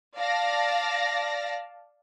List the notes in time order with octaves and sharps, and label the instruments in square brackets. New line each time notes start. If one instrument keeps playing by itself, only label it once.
[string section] D5 F5 A5 A#6